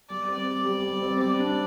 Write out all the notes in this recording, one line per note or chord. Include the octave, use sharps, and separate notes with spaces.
G3 D5
C4
G4
G3
G3
C4
G3 D5
D4